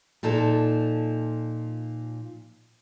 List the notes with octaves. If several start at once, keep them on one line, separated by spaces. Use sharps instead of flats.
A#2 F3 D#4 A4